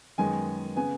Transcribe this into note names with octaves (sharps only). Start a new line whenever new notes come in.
F#2 D#3 G#3 B3 G#5
C#3 B3 G#5